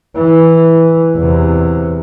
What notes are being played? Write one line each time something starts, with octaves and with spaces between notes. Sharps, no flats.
E3
E2 C3